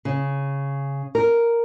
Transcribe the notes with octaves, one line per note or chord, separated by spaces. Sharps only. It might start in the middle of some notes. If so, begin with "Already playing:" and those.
C#3
A#4